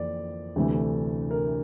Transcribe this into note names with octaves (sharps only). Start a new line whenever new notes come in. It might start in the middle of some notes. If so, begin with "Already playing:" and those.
Already playing: F2 E3 A#3 D5
D2 C3 E3 A3 D4
A#4